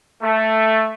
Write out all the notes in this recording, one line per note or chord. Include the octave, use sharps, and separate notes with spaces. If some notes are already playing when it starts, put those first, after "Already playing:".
A3